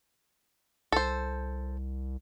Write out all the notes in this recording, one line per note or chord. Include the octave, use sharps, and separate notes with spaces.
C2 A4 C5